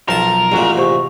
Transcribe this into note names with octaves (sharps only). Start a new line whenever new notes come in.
B1 F3 A4 A#4 A5
A1 A#2 G#3 F#4 F#5
C3 C5 C#6